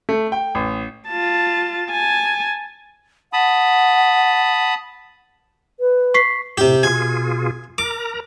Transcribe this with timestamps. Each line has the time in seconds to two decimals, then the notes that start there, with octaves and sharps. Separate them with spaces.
0.09 A3
0.32 G5
0.55 A1
1.08 F4 A5
1.90 G#5 A5
3.33 F#5 A5 B5 D#6
5.80 B4
6.14 C#6 B6 C7
6.58 A2 C3 G4
6.83 B2 F4 G#4 G#5
7.78 A#4 A#5 D6